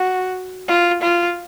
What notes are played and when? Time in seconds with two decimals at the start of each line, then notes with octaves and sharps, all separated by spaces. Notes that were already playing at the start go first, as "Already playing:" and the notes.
Already playing: F#4
0.68 F4
1.01 F4